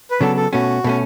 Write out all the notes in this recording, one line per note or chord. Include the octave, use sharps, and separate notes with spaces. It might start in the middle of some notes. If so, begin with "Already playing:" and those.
B4
C#3 F#3 B3 D4 A4
A4
B2 A3 C#4 F#4
B2 A3 C#4